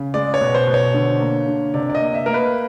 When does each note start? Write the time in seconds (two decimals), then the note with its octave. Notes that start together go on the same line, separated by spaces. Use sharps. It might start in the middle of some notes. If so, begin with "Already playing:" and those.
Already playing: C#3
0.14 G#3 D5
0.34 C#5
0.41 B2
0.55 C5
0.67 B2
0.74 C#5
0.94 D3
1.20 A#3
1.48 D3
1.74 C3 D5
1.90 D5
1.95 D#5
2.01 A#3
2.14 E5
2.26 A#3 A#4
2.34 B4